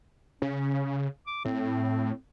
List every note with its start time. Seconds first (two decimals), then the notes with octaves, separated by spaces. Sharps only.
0.42 C#3 C#4
1.27 D6
1.45 A2 C4